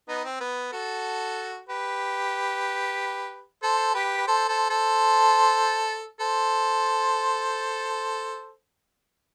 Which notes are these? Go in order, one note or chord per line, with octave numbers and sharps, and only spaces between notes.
B3 D#4
C4
B3
F#4 A4
G4 B4
A4 C5
G4 B4
B4
A4 C5
A4 C5
A4 C5
A4 C5